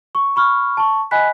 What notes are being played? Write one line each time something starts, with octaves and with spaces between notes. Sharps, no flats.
C#6
B5 C#6 F6
A5 C#6
D#5 F#5 G#5 B5 F#6 B6